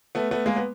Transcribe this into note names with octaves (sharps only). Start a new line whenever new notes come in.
A3 B3
A3 B3
G#3 A#3
B3